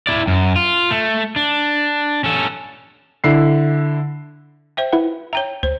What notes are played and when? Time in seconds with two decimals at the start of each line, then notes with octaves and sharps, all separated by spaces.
0.07 E4 D5
0.27 F#2
0.56 F4
0.91 A3
1.36 D4
2.24 C#4 A4
3.24 D3 E4 C7
4.77 C5 E5 G5
4.93 E4 B4 E5 F#5
5.33 C#5 E5 G5 A#5 G6
5.63 D2 C5